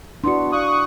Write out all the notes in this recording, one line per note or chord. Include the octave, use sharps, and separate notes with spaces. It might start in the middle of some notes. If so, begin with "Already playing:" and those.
B3 D4 E4 F#4 C6 C#7
D5 F5 C#6 D#6 F#6